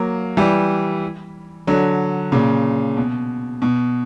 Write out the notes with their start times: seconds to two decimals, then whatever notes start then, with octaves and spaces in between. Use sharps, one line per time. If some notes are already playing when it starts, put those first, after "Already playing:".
Already playing: F#3 A#3
0.37 E3 G3
1.67 D3 F#3
2.32 A#2 C#3
2.97 B2
3.62 B2